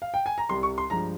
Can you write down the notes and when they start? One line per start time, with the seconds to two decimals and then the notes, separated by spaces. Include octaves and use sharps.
0.02 F5
0.14 G5
0.26 G#5
0.38 A#5
0.49 C2 C3 G3 C6
0.63 C#6
0.78 C6
0.90 G2 F3 G#3 A#5